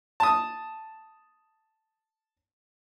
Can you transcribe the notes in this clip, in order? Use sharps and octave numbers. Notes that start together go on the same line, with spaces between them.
A5 D#6